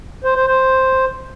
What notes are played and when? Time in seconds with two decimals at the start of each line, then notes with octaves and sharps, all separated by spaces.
0.24 C5
0.36 C5
0.47 C5